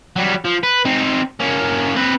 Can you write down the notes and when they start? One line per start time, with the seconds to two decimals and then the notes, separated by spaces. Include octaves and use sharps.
0.16 F#3 G3
0.45 F3
0.63 B4
0.85 C4 D#4
1.40 A#3 C#4
1.96 C4 B4